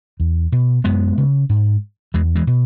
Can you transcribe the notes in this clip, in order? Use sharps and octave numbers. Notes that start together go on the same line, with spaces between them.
E2
B2
F#2 G#3 B3
C#3
G#2
E2 E3 G#3
E3 G#3
B2